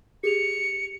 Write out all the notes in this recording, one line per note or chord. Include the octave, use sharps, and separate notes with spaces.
G4 G#4 C#7 F7